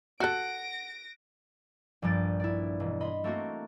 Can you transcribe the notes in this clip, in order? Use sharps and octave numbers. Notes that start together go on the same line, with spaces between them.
F#4 A4 F#5 F#6 A#6 D7
A#1 G2 G3 A6 D7
E4 D5
E1
D#5 B5 C6
A3 A#3 C4 F#4 A#4